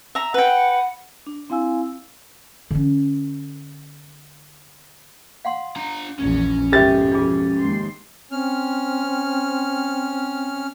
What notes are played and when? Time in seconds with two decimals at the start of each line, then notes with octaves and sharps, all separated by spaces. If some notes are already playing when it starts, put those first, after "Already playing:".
0.15 E5 A#5
0.34 B4 F#5 G5
1.27 D4
1.50 C4 E4 F5 G#5 E6
2.71 D3 C#4
5.45 F5 F#5 C6
5.76 D4 A#5
6.19 A#1 E2 C#4
6.72 F2 G#2 B2 G4 A#4 C#5 E5 A6
7.12 D4 F4 G#4
7.60 D#2 G#2 C6
8.31 C4 C#4 F6